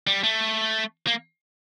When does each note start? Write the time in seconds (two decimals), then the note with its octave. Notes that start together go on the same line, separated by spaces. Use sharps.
0.07 G3
0.24 A3
1.07 A#3